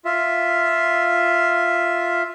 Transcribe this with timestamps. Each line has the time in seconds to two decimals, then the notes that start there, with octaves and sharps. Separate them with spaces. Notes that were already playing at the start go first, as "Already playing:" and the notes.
0.05 F4 E5